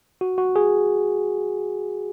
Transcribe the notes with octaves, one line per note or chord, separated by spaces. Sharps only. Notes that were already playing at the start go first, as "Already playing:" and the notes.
F#4
F#4
G#4